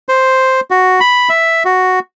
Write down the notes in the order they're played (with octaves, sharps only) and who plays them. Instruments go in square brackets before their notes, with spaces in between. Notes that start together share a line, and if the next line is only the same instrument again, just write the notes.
[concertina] C5
F#4
B5
E5
F#4